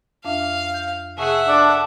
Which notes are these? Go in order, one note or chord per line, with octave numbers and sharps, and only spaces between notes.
F2 D4 E5 F5
G6
C3 G#4 E5 F#5 A5 C#6
D4 A4